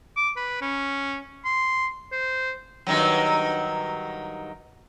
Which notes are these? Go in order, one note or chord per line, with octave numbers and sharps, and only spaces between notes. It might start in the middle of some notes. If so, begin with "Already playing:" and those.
D6
B4
C#4
C6
C5
G2 D#3 F#3